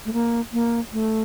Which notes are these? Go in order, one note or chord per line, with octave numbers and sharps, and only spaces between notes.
A3
A#3
A#3
A3